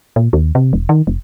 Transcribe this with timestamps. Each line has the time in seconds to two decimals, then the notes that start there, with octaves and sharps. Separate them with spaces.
0.16 A#2
0.33 D#2
0.55 C3
0.73 E1
0.89 D#3
1.07 F1